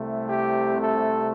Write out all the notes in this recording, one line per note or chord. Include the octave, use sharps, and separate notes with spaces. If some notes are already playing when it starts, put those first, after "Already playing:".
Already playing: C2 C3 A3
G4
A4